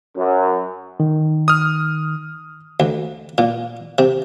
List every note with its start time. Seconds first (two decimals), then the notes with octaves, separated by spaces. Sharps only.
0.16 F#2
1.00 D#3
1.48 D#6 F6
2.80 D2
3.38 A#2
3.98 C3